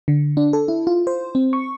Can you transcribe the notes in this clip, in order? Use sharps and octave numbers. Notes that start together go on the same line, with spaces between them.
D3
D4
A4
E4
F4
C5
C4
C#6